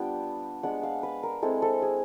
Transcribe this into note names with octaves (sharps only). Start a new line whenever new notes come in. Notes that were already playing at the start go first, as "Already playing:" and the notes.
Already playing: G3 B3 D4 F4 G5
G#3 B3 D4 F#5
F5
B4
A#4
G#3 C4 E4 A4
A4
G#4